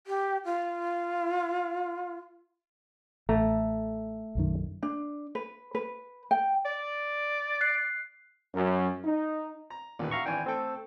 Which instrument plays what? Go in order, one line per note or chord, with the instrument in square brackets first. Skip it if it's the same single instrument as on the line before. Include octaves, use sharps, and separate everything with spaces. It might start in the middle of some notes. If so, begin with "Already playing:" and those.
[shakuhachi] G4
F4
[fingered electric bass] A1 [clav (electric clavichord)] A3 A#5
[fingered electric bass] B1 F#2 D#3
[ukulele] D4
B4
B4
G5
[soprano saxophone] D5
[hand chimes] F#6 C7
[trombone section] F#2
D#4
[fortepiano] A#5
[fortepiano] A1 D#3 B4 [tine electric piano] D#2 A#2
[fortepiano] F#4 E5 [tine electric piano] F5 A#5 C#6
[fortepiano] G#1 E3 D4 [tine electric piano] G5 G#5
[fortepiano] A3 G5 [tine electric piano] C4 A4